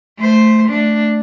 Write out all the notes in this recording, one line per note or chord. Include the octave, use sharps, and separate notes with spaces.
A3 C5
A3 D4